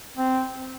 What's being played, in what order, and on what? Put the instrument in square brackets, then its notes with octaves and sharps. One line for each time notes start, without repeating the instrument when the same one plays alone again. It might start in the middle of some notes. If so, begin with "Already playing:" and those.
[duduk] C4